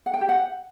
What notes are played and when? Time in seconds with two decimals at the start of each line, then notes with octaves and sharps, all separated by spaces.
0.06 F#5
0.14 G5
0.21 G4
0.29 F#5